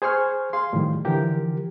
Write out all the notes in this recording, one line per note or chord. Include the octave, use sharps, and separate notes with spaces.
G#4 C5 G#5 C#6 F6
G#4 F5 C6
A2 D#3 F3 G3
D3 E3 F3 G4 A#4